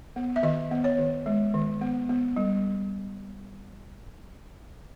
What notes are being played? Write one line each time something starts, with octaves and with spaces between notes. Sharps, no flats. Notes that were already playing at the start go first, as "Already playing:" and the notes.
B3
E5
D#3 D#5
B3
C#5
D#3
G#3
D#3
B3
B3
G3